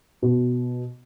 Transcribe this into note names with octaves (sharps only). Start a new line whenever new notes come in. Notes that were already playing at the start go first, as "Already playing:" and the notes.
B2